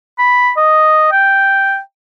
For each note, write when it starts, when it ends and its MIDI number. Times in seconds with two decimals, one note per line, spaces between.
0.18 0.51 83
0.57 1.09 75
1.12 1.79 79